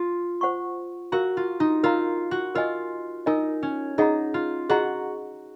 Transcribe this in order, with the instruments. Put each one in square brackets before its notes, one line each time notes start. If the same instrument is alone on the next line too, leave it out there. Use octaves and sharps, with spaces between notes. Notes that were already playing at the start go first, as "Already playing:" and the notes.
Already playing: [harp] F4
[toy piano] C5 F#5 C#6
[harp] F#4 [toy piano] A#4 F5 A#5
[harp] F4
D#4
[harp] F4 [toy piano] A#4 F5 A#5
[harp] F#4
[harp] F4 [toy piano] A#4 D#5 G#5
[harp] D#4 [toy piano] A#4 D#5 G#5
[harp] C#4
[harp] D#4 [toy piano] G#4 D#5 F#5 A#5
[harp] F4
[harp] F#4 [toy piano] G#4 D#5 F#5 A#5